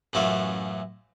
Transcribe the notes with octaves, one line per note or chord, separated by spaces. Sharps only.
A1 F#2 F#3 A3 F4